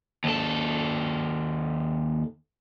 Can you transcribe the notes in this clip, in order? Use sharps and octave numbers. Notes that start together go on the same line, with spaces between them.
D#2 A4